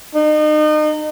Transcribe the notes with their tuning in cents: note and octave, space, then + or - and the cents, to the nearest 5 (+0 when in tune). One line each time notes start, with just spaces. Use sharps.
D#4 -35